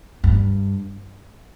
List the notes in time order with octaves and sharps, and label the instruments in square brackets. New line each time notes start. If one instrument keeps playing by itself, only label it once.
[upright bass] G2